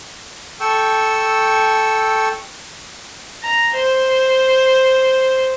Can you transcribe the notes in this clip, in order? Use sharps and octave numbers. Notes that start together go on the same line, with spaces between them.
A4 G5 C#6 E6
A#5
C5